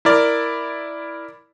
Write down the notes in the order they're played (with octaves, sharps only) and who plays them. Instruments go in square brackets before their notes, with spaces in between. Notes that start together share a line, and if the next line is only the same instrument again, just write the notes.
[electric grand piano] E4 A#4 D5